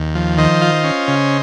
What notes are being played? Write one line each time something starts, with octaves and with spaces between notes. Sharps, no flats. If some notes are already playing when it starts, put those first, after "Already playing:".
Already playing: D#2
F3
D#3 C5 D#5
F4
C#4
C#3